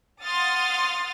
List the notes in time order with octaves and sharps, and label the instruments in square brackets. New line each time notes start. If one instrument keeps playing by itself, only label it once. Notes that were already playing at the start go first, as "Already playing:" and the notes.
[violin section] F5 F#5 C6 D#6 F6 A6